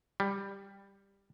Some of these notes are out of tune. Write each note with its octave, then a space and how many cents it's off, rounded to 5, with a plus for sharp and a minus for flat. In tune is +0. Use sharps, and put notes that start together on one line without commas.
G3 +10